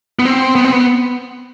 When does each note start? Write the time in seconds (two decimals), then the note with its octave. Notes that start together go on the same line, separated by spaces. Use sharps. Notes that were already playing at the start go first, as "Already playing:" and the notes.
0.19 B3
0.25 C4
0.55 B3
0.65 C4
0.72 B3